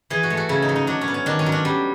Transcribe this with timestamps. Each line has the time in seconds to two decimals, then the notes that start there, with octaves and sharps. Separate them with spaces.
0.10 E3 G#4
0.23 F#4
0.30 A3
0.37 F#4
0.49 C#3 E4
0.62 D#4
0.69 F#3
0.76 D#4
0.87 F#3 D4
1.01 C#4
1.08 B3
1.14 C#4
1.26 D#3 D4
1.39 C#4
1.46 F#3
1.52 D4
1.65 G3